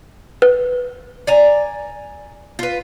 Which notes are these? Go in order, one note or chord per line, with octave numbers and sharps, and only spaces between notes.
B4
D5 G#5 A#5
F4 B4